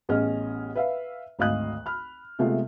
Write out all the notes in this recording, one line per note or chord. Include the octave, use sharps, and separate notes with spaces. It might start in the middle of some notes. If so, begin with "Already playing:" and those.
A1 B3 C#4 G#4 D#5 F6
B4 E5 F5
G#1 D2 D#5 F5 D#6 F#6
B5 F6
C3 G#3 A3 B3 F4